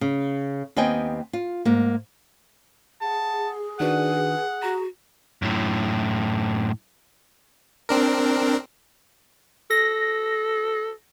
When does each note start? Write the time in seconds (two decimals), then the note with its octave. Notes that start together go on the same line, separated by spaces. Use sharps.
0.01 C#3
0.76 D#2 B3 C4 D#5 G5 G#5
1.33 F4
1.65 G#2 A#3
3.02 G#4 F#5 A5
3.80 D#3 D4 F#4 B4 F#5
4.63 F#4 A#5
5.42 F#2 A2
7.89 C4 D4 A#4
9.71 A4 A#6